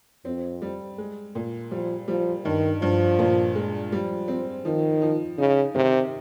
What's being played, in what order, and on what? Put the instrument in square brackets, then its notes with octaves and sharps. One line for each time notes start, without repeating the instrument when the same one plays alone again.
[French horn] F2 [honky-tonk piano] C4
[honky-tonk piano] G3
G#3
A#2
[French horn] F3 [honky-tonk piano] G3
[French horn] F3 [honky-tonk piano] G3
[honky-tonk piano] G2 [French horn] D#3
[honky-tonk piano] G2 [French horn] F3
[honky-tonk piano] A#2
G#3
[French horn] F3 [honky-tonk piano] G3
[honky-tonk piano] C4
[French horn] D#3 [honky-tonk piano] F3
[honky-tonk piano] F3
[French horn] C#3 [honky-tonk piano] D#4
[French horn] C3 [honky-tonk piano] D#3